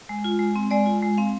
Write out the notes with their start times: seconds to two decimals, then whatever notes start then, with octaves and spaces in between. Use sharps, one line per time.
0.09 G#3
0.24 F4
0.39 G#3
0.56 C4
0.71 G#3 D5
0.86 F4
1.02 G#3
1.18 C4 F5